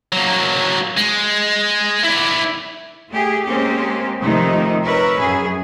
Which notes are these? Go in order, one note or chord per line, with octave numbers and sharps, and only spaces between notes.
F#3 A#3
G#3
E4 D5
A3 G4 G#4
G#3 A#3 C4 C#4 G4
C3 D#3 F3 A3 D#4
A#4 B4 C#5 E5
F#2 G#4